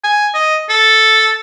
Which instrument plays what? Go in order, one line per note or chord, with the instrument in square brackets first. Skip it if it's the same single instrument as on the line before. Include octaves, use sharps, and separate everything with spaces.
[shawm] G#5
D#5
A4